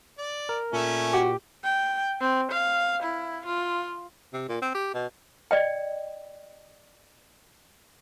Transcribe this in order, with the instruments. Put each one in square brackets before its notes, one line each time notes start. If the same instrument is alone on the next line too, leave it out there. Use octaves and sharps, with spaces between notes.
[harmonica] D5
[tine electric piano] A#4
[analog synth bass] A#2 [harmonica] A3 C#4
[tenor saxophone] F#4 [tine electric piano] G4
[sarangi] G5
C4
F5
E4
F4
[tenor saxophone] C3
A#2
C4
G4
B2
[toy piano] D5 D#5 G5